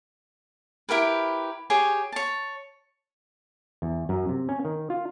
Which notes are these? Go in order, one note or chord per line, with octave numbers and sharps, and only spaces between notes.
E4 G4 A#4 B4
G4 G#4 C#5
C#5 A5
E2
F#2
C3
C#4
D#3
F4